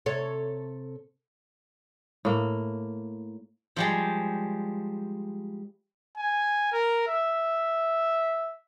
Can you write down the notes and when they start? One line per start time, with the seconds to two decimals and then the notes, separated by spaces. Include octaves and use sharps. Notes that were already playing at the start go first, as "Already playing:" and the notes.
0.06 C3 A4 C#5
2.25 A2 A#3
3.76 F3 G3 G#3
6.17 G#5
6.72 A#4
7.08 E5